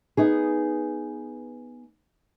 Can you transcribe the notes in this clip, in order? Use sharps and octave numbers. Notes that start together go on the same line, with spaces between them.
B3 D#4 G#4